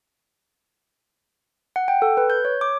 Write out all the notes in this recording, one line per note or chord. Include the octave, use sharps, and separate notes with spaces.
F#5
G5
A4
B4
G6
C#5
D6